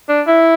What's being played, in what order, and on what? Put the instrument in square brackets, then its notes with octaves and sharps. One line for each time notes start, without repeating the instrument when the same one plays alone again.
[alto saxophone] D4
E4